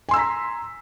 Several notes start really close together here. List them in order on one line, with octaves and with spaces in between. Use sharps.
G#5 C6 E6 A#5 B6